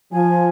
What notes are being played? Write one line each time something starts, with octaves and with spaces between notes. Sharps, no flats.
F3 G#5